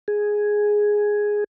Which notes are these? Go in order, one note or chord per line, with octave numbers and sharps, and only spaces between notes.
G#4